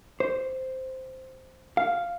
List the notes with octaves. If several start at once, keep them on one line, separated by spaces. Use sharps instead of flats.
C5
F5